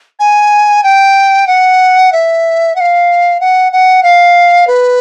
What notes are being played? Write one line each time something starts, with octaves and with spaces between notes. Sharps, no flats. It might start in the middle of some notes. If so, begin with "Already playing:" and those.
G#5
G5
F#5
E5
F#5
F5
F#5
F#5
F5
B4